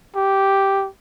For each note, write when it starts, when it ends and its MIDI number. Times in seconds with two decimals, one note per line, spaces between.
0.16 0.87 67